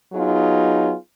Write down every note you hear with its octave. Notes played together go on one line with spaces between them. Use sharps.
F#3 B3 D#4 F4 G#4